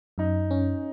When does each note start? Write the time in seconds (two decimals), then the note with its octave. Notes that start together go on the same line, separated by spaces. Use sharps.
0.18 F#2 D#4
0.51 C#4